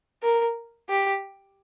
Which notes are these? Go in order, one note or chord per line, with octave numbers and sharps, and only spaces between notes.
A#4
G4